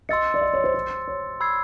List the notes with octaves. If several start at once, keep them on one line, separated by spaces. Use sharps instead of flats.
D#5 C6 E6 A6 C#7
D5
D#5
C#5
C5
C5
C#5
B5 E6 G#6 C7